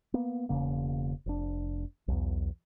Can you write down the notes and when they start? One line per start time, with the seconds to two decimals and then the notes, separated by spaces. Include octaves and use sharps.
0.14 A#3 B3
0.49 E1 C#3 A#3
1.26 F1 D4
2.08 B1 E2